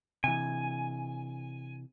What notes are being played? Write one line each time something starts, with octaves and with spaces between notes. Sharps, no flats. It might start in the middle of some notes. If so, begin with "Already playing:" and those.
C3 E3 G#5